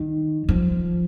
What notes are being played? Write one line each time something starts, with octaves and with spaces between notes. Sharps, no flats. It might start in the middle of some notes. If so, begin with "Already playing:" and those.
Already playing: D#3
F3